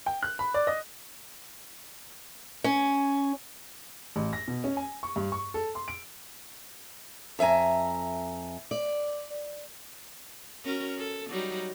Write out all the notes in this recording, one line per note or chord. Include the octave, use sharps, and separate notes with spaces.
G5
F#6
B5
D5
D#5
C#4
A1
A#6
B2
C#4
G#5
C#6
G2
C#6
A4
C6
D7
F2 E5 F#5 G#5 A#5
D5
C#4 F#4 A#4
A4
F#3 G3 D#4